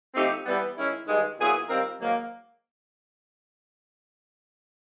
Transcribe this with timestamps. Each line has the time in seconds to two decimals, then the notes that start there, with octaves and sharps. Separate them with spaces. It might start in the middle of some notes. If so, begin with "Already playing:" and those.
0.15 F3 A3 C4 D#4 G4
0.46 E3 G3 B3
0.77 D#3 G#3 C#4 E4
1.06 G2 D#3 G#3
1.38 A#2 F#3 B3 E4 G#4
1.68 D#3 G3 C4 F4 A#4
1.99 G#2 D#3 F#3 A#3